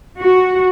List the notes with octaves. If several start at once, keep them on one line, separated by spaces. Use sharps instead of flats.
F#4